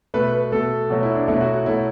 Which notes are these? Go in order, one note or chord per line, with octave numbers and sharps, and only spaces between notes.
B2 A3 B4
B4
B2 A3 A4
B2 F#3 A3 F#4
E4
D4
B2 F#3 A3 E4
F#4
F#4
B2 F#3 A3 E4